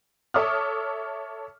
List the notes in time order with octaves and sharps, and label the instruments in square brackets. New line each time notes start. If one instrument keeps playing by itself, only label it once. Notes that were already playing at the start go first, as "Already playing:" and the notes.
[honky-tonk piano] A4 C#5 E5 D6 D#6 F6